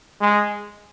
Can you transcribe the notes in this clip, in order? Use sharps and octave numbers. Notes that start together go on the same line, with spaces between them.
G#3